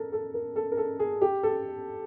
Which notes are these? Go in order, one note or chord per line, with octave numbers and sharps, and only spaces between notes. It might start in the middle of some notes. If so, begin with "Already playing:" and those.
Already playing: A4 A#4
A4
A#4
A4
A#4
A4
G#4
G4
A4